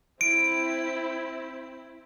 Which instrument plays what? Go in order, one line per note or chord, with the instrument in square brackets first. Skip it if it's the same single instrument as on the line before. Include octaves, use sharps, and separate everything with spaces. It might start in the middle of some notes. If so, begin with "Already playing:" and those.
[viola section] C4 E4 [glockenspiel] D7